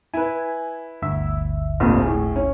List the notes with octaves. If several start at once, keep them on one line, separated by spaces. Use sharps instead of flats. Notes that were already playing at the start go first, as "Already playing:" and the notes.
E4 B4 G#5
G1 D2 E5
F1 A#1 F2
A2 G#4
C#4